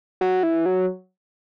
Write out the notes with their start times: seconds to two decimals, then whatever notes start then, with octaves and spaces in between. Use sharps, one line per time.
0.21 F#3
0.43 E3
0.66 F#3